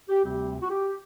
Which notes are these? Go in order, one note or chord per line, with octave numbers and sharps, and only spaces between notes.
G4
D2 C3 G3 C4 G4
F#4
G4